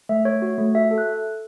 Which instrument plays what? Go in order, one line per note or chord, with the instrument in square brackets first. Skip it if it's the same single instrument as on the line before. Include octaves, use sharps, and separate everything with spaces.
[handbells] A3 E5
A3 C#5
F#4
A3
F#4 E5
A4
F#6